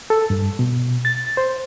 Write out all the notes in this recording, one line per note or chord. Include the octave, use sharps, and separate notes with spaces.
A4
G2
B2
A6
C5